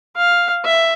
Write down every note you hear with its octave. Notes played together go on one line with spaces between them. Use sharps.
F5
E5